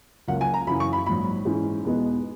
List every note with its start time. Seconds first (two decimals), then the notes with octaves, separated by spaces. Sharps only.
0.28 C#2 C#3 F#3 A#3 F#5
0.41 G#5
0.54 A#5
0.67 F#2 C#3 E3 B5
0.80 C#6
0.93 B5
1.06 A#1 G#2 F#3 B5
1.45 G#2 E3 G#3 C#4
1.84 E2 B2 G#3 B3 D#4